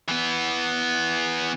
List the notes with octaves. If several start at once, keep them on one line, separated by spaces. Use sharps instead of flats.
E3 B3